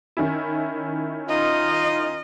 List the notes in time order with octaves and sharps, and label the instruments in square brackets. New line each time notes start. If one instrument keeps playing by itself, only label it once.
[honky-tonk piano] D#3 C#4 E4
[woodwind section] D#4 F4 [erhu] D#5